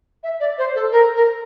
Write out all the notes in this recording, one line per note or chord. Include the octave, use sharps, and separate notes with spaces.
E5
D5
C5
A4
A#4
A#4